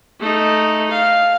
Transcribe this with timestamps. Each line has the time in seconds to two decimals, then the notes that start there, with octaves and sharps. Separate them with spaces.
0.20 A3 D#4
0.90 F5